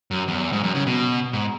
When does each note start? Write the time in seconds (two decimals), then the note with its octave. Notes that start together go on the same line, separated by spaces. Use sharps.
0.11 F#2
0.28 E2
0.53 G#2
0.63 F#2
0.75 C#3
0.87 B2
1.33 G#2